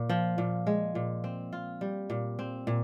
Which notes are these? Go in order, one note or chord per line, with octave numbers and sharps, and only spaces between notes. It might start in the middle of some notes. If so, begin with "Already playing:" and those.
Already playing: A#2
F3
A#2
G#3
A#2
C4
F4
G3
A#2
C4
A#2